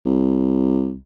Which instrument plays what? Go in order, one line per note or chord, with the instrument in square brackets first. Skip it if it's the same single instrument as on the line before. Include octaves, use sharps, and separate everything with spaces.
[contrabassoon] C2